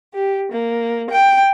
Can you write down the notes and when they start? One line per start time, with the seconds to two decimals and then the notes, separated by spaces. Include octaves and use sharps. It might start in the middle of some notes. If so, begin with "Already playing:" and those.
0.14 G4
0.52 A#3
1.11 G5